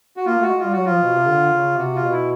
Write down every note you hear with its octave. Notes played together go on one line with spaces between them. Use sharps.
F#4
A#3 F4
A3 F#4
G#3
F4
G3
F#3 F#4
F3 F4
B2
C3
D3
C#3
C3 F#4
F4
B2
E4